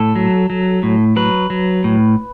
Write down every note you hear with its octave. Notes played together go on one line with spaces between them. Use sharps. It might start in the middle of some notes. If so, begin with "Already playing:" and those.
Already playing: A2 A4
F#3
F#3
A2
F#3 B4
F#3
A2